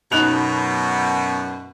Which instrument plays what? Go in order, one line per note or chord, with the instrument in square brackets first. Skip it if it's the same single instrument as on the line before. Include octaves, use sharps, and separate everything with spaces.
[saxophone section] F#2 B2 [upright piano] D#4 F#6 F7